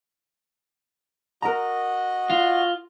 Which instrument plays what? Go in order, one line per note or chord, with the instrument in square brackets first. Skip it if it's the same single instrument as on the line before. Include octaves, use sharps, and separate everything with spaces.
[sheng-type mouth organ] F#4 D#5 [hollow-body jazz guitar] A#4 A#5
[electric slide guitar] F4